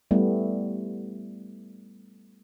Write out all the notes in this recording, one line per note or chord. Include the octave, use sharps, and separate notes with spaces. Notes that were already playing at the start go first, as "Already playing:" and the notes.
G3 A3 B3 E4